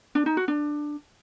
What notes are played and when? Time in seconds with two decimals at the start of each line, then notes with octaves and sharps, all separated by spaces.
0.15 D4
0.26 D#4
0.37 F#4
0.48 D4